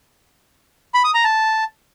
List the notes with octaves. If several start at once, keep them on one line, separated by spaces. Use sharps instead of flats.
B5
D#6
A#5
A5